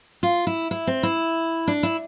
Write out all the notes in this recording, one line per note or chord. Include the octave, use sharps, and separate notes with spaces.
F4
E4
E4
C4
E4
D4
E4